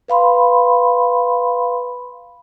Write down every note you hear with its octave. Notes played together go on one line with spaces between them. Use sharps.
B4 F5 B5 C6